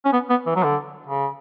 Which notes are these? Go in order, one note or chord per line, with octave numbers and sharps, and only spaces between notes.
C#4
B3
B3
E3
F#3
D3
C#3